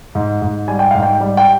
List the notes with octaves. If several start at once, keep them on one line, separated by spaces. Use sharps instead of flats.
G#2
G#2
G3 G#5
G5
G#2 F5
G5
G3
G5